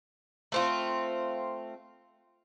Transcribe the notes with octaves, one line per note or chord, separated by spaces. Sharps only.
A3 C4 F4